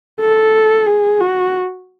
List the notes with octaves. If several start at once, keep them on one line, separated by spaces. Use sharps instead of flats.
A4
G#4
F#4